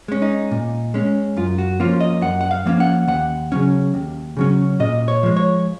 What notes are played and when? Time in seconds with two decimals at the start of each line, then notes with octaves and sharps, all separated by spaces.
0.08 G#3 C#4
0.22 D#4
0.51 A#2
0.94 G#3 C#4
1.37 F#2 F4
1.58 F#4
1.80 F3 A#3 C#4 F4
2.00 D#5
2.22 F#2 F#5
2.41 F#5
2.51 F5
2.66 F3 A#3 C#4
2.80 F#5
3.08 D#2 F#5
3.52 C#3 F#3 C#4
3.94 D#2
4.37 C#3 F#3 C#4
4.80 A#2 D#5
5.08 C#5
5.23 F3 G#3
5.37 C#5